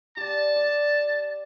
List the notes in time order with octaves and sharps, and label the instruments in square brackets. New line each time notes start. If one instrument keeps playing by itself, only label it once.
[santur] G4 D5 [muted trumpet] A5
[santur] D5